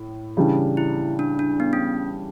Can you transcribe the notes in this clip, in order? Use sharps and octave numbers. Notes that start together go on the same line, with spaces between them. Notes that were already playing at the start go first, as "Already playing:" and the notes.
Already playing: A2
C#3 E3 G3 D4
E4
D4
D4
B3
C#4